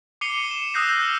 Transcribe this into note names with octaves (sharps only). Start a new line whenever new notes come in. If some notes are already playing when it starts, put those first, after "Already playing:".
D6 C7 C#7 D#7 F7 G7
C#7 E7
D#6 E6 F#6 G6 A#6 C7
F6 G6